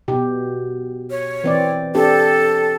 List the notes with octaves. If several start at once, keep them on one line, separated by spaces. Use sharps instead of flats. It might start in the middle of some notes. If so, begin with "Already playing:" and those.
B2 G4
C#5
E3 C4 D5
C4 D4 G4 A4